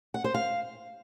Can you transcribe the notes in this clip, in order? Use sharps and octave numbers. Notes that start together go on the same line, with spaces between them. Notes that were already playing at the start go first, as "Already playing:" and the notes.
F#5
C5
F5